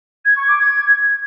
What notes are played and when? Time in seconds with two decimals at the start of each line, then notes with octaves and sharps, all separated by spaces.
0.24 G#6
0.36 C#6
0.47 D6
0.59 G#6